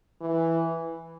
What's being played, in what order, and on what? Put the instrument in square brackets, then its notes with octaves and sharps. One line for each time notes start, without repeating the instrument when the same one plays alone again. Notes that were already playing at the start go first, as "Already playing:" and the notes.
[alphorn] E3